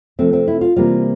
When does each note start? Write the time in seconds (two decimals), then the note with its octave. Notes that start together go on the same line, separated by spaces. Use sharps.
0.19 C3 F3 A3 C4
0.33 C4
0.48 E4
0.61 F4
0.76 C3 E3 G3 A#3 F4